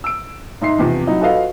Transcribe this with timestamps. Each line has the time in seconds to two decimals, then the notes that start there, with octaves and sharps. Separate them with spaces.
0.04 E6 D7
0.61 G#2 D#4 E5 C6 C7
0.78 E2 C3 F3
1.06 F#3 D#4 E4
1.20 F4 F#4 A4 B4 D#5 F5